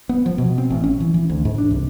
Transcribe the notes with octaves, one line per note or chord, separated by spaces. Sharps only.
B3
F3
B2
C4
A1
C#4
E3
E3
D2
G#2
D4
C2